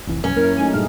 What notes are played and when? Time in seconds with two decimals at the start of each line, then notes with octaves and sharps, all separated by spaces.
0.07 F1 C2 E3
0.24 C2 F#2 C#4
0.36 F#2 A#3 E4 A#4
0.57 F#3 A3 D#4 G#5
0.73 G2 A#2 D#4 G#4 F6